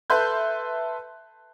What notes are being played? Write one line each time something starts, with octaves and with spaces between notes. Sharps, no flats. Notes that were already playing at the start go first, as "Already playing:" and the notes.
A4 B4 E5 C6 F#6 G6